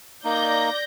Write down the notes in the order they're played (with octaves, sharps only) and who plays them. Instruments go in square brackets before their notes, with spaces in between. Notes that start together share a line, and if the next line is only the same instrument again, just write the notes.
[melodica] A#3 D#4 [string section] D5 G6 A#6